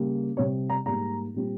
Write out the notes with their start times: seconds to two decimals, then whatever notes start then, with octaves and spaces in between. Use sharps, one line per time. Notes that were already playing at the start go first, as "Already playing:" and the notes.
Already playing: C#3 G3 A#3
0.37 C3 G3 C4 C#5
0.70 A#5
0.86 G#2 G3 A#3 A#5
1.34 A#2 G3 C4